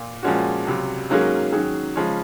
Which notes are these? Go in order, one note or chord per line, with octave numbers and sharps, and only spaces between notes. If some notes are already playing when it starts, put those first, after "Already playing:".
Already playing: A#2
A#2 F3 G#3 C#4 F#4
C#2 C3 F#3
G#2 F#3 A#3 C#4 G#4
D#3 F#3 C#4 G#4
C#3 F3 G#3 C#4